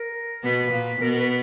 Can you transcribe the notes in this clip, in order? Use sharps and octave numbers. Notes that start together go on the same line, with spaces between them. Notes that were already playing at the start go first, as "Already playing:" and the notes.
Already playing: A#4
B2 B3 B4
A#2 A#3
B2 B3 A#4
A#4
B4